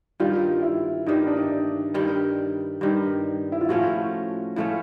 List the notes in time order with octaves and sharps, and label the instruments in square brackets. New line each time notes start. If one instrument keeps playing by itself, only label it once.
[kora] G2 D#3 G3 [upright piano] F4
[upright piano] E4
[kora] G2 D#3 G3 [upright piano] D#4
[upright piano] D4
D#4
[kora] G2 D#3 G3
G2 D#3 G3
[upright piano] E4
F4
[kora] A2 F3 A3 C#4 [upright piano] F#4
[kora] A2 F3 A3 C#4